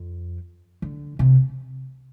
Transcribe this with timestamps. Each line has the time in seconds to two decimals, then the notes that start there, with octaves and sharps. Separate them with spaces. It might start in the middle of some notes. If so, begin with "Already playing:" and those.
Already playing: F2
0.82 D3
1.19 C3